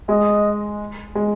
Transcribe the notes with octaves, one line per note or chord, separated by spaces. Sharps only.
G#3 D#5
G#3